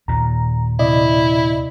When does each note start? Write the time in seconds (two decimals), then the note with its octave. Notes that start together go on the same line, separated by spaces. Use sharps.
0.08 D#2 A#2 A#5
0.79 C3 E4 D5 D#5